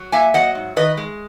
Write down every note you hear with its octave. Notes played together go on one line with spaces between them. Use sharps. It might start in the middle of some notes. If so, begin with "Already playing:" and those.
Already playing: F#3
A#3 E5 G#5
F#3 D#5 F#5
G#2
D#3 B4 D#5
G#3